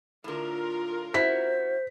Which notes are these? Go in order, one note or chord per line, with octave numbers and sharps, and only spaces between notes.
A2 D3 F4 A#4
C#4 E4 F#4 C5 B6